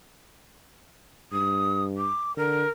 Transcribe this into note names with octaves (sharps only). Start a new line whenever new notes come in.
G2 D#6
D6
D3 A#4